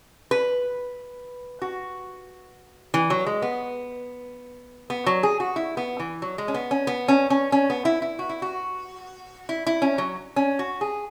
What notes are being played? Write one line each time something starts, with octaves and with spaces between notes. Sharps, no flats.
B4
F#4
E3
F#3
G#3
B3
B3
F#3
G#4
F#4
E4
B3
E3
F#3
G#3
C#4
B3
C#4
B3
C#4
C#4
C#4
B3
E4
E4
F#4
E4
F#4
E4
E4
C#4
F#3
C#4
F#4
G#4